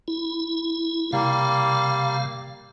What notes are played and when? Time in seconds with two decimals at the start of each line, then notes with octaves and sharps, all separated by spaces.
0.08 E4
1.13 C3 G3 A#3 F5